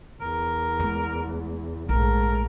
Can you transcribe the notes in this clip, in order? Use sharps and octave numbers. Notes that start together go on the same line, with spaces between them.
E2 A#4
G#3 A3
A#1 G#2 A3 A#4